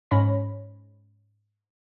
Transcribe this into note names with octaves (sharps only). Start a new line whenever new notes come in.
G#2 C#4 C#5 B5 A#6